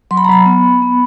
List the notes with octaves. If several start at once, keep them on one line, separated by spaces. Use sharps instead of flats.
F#3 C6
B5
A#5
F#3 B5
B3
B3
B3